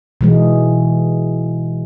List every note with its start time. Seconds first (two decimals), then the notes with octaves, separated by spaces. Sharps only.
0.21 B2 E3 G#3